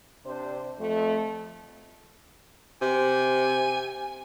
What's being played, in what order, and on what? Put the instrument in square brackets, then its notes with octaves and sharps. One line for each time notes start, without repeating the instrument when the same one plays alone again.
[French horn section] C3 D4 C5
F2 A3
[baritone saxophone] C3 [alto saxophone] G#5